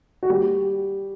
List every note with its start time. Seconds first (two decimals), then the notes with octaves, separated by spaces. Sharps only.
0.23 F#4
0.30 G3 G4